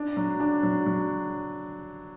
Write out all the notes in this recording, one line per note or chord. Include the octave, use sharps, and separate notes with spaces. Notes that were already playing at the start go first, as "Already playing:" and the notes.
Already playing: D4
F#3
D4
F#3
F#3